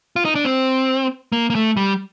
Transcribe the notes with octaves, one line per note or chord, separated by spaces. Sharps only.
F4
D#4
D4
C4
A#3
A#3
A3
G3